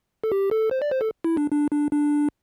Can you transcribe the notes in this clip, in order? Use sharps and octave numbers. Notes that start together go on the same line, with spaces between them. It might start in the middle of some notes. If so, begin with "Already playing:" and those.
A4
G4
A4
C5
D5
C5
A4
E4
D4
D4
D4
D4